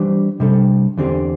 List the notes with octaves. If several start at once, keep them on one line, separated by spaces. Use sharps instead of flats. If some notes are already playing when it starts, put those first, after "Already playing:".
Already playing: E3 G3 D4 G4 C5
C3 G3 D4 A4
E2 D3 C4 G4